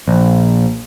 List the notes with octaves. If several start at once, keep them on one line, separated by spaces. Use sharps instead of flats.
A#1